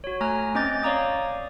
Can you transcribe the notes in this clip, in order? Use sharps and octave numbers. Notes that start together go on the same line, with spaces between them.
F#4 C#5
A3 G#5 A#5 F6
C4 C#4 D#5 D6 G6 A6
C#5 D5 F5 A#5 D6 D#6